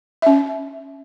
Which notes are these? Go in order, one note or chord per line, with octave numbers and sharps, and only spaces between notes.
C#4 E5